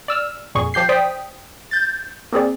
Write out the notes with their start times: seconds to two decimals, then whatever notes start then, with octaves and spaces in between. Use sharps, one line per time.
0.08 D5 E6 F6
0.55 F2 A#2 G#4 C#6
0.74 F3 G4 G6 C7
0.89 C5 D5 G5 D#6 B6
1.71 G6 A6
2.32 A#3 C4 G#4 D5